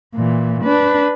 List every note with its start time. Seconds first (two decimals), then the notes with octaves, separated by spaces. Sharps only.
0.15 A#2 E3
0.64 D4 B4